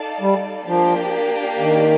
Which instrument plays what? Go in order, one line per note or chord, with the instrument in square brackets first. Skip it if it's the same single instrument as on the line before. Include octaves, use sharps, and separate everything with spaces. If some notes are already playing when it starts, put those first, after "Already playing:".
Already playing: [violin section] D#4 A4 D5 F5 A5
[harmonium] G3
[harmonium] F3 [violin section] A#3 D4 G4
[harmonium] D#3